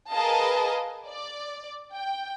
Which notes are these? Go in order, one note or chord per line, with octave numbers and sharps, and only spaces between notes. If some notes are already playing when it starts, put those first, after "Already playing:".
G#4 A#4 B4 D#5 F5 A5
D5
G5